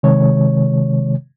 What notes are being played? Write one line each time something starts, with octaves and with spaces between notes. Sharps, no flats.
C3 D#3 G#3 C#5